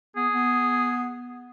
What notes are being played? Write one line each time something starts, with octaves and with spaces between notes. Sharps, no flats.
B3 G#4
B3